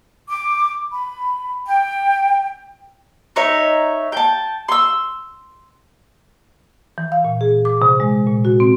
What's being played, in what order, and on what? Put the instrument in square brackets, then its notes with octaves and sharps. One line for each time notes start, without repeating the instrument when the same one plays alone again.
[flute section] D6
B5
G5
[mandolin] D#4 C#5 E5
G5 A5
C6 E6
[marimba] E3
F5
A#2
G#4
D6
C3
G#3
A#2
F#4
C4